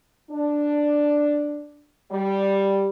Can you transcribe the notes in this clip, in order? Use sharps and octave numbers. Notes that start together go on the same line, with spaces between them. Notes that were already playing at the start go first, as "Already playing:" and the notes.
D4
G3